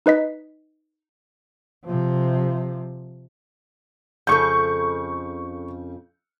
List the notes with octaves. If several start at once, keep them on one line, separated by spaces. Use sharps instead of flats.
D#4 B4 D#5 B6
C3 F3
F2 C#3 A4 C#6 G6